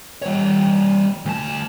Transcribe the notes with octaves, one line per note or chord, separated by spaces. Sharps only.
G3 C#5
D2 A5